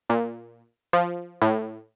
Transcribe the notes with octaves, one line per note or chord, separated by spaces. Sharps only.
A#2
F3
A2